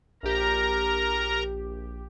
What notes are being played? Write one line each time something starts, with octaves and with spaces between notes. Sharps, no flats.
A#1 G4 A#4 A#5